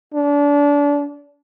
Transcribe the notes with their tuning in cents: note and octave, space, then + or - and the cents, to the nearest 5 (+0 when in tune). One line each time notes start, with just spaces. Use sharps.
D4 -30